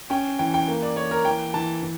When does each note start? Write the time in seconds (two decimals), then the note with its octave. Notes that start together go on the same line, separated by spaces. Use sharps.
0.10 C#4 G5
0.39 E3 G5
0.54 G5
0.68 A#3
0.82 D5
0.96 A#3 C#5
1.11 A#4
1.25 E3 G5
1.54 E3 A5
1.83 E3